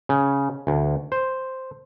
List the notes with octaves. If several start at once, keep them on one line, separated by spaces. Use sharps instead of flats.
C#3
D2
C5